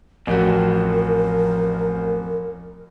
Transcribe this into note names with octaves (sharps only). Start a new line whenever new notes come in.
A1 F2 F#4 A#4